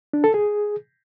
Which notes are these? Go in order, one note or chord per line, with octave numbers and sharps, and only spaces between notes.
D4
A4
G#4